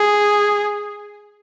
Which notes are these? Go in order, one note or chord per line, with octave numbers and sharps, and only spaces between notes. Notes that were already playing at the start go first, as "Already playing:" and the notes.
Already playing: G#4